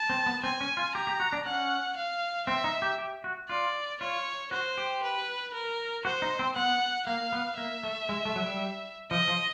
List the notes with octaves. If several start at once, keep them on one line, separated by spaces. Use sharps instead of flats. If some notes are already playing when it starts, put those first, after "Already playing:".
Already playing: A5
C4
B3
C4 G#5
C#4
F4
G4 A#5
G4
F#4
D4
C#4 F#5
F5
C4 E5
D#4
G4
G4
F#4
F4 D5
F4 C#5
F#4 C5
G4
B4
A#4
F#4 C5
D#4
C4
B3 F#5
A#3 F5
B3
A#3 E5
A3
G#3
A3
F#3
G3
F3 D#5
F3